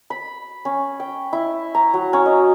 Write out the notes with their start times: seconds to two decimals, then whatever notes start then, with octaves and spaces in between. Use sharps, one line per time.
0.10 B5
0.65 C#4
1.00 G5
1.33 E4
1.75 A#5
1.94 F#3
2.13 C#4
2.26 D#5